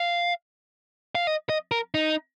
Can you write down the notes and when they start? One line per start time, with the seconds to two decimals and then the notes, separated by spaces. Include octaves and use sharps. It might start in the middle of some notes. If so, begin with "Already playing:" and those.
Already playing: F5
1.15 F5
1.27 D#5
1.49 D#5
1.71 A#4
1.94 D#4